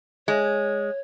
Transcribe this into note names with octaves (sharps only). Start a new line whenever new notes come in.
G#3 C#5